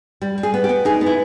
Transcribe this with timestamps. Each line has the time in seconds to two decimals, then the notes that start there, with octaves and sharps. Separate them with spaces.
0.22 G3
0.38 G3
0.43 G#4
0.54 B3
0.64 G4
0.69 B3
0.85 D#4 G#4
1.01 B3
1.06 E4